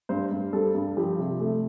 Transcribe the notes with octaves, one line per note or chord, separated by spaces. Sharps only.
G2 C5
G2
G3 A4
G2
F3 G4
C3
A3